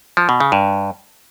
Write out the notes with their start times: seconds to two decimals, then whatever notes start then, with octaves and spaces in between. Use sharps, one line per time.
0.17 F3
0.29 B2
0.40 C#3
0.52 G2